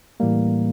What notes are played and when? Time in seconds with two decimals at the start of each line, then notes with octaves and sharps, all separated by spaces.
0.20 A2 E3 G3 A#3